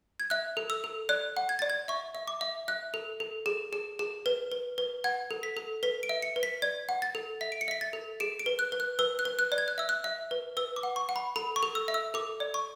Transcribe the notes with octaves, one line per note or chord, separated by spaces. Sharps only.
G#6
E5 F#6
A4
E6
A4
D5 F#6
F#5
G#6
D5 A6
G#6
E5 C#6
E5
D6
E5
E5 F#6
A4
A4
G#4
G#4
G#4
B4
B4
B4
F#5 G#6
A4
B6
A4
B4 B6
D7
E5
C#7
B4
B6
D5 G#6
F#5
A6
A4
E5 B6
D7
C#7
E5 B6
A6
A4
G#4 D7
D7
B4
F#6
B4
F#6
B4 E6
F#6
B4
F#6
D5
G#6
F#6
E5 E6
F#6
E5
B4
B4 E6
D6
F#5
C#6
F#5
B5
A4 B5
C#6
A4
E6
E5
E6
A4 D6
D5
C#6